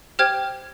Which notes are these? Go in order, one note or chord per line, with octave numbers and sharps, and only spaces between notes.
G4 C5 G5 F6 G#6